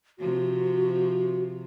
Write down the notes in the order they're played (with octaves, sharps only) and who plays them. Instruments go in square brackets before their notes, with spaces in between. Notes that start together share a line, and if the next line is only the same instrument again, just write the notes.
[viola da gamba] C3 F3 [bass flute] F#4